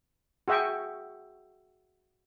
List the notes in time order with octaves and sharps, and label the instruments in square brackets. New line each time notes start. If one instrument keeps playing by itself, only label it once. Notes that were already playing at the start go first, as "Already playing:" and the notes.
[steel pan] F#4 G#4 E5 G5 C#6